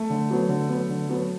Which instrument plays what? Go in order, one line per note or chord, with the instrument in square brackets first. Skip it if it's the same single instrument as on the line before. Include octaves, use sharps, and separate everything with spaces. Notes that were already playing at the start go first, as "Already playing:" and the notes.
Already playing: [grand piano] A3
[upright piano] D3
F#3 B3
D3
F#3 B3
D3
F#3 B3